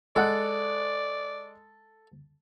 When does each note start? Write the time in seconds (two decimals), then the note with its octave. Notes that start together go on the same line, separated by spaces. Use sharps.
0.16 G#3 A4 D5 F#5 F#6